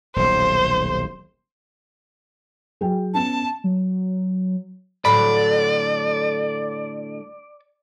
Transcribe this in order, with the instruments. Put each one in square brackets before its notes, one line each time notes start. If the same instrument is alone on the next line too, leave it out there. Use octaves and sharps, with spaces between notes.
[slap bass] D#1 B1 [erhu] C5
[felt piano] F#3 G#4 G5
[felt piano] B3 C#4 [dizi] A5
[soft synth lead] F#3
[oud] A2 D3 F#3 [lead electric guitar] D5 [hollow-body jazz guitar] B5